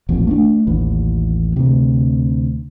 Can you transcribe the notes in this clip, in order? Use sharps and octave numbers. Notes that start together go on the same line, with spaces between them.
D#1 A1 F2
A3 C#4 D4
A1 D#2 E3
D2 C3